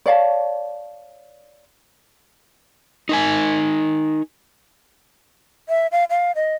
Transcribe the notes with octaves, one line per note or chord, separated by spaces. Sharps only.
C#5 D5 F5 A5
D#4 A#4 G#5
E5
F5
F5
D#5